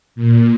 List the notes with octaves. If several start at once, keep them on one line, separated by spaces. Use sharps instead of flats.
A#2